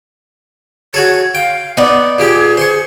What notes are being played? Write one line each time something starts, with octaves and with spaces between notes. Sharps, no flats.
F#4 G#4 A4 C#5
F5 G5
B3 D#4 D5 F#5
A#2 A#3 G4 G#4
C5 C6 C#6